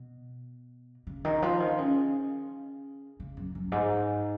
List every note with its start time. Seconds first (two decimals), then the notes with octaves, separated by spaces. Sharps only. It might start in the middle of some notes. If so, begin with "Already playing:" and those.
Already playing: B2
1.07 C#3
1.25 D#3
1.42 F3
1.60 D#3
1.78 C#3
3.20 C#3
3.37 F#2
3.55 F#2
3.72 G#2